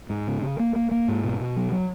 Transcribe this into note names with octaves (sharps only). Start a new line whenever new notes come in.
G#2
C#3
C#3
A#3
A#3
A#3
G#2
B2
B2
F#3
F#3